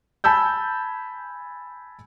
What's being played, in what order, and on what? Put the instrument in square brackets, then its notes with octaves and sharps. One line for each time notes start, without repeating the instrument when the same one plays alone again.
[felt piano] G#5 A5 B5 E6 G6